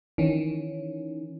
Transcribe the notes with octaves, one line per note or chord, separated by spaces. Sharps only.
D#3 E3 C#4